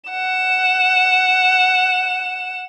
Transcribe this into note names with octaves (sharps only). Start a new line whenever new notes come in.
F#5 E7